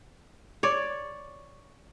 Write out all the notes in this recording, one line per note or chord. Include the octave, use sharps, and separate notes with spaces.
C#5 D5